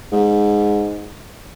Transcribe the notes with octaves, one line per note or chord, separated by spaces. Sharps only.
G#2